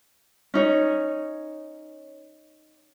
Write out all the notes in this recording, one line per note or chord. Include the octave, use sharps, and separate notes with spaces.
C#4 D#4 C#5